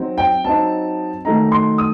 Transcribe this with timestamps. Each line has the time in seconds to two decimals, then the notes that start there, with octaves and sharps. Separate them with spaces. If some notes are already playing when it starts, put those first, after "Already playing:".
Already playing: F#3 C4 D#4
0.18 G5
0.44 F#3 C4 D#4 A5
1.25 D#3 F#3 A3 D#4 A#5
1.52 C6
1.78 D#6